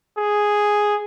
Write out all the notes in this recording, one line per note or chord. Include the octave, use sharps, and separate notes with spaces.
G#4